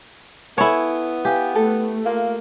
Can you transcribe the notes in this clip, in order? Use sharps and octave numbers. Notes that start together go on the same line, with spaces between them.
B3 E4 A4 C#5 G#5 A5
G4 B4 F5 G#5
A3 A4 B4
A#3 F4 F5